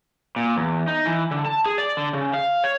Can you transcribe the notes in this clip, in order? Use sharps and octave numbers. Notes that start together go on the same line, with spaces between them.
A#2
E2
D#4
E3
D3
A5
G#4
D5
D3
C#3
F5
C#5